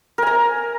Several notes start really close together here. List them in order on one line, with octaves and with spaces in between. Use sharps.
A#4 G#5 A#5